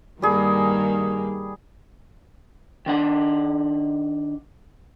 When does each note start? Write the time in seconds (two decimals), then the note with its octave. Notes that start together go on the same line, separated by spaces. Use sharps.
0.22 G2 D#3 G3 A#3 G#4
2.86 D#3 D4 F#5